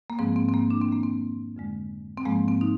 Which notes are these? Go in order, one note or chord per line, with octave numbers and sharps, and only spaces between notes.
A#3
G#2 F3 G#3 C4
C4
C4
A#3
D4
C4
F2 D#3 G#3 A#3
C4
F2 D3 G#3
C4
G#2 F3 G#3 A#3
C4
D#4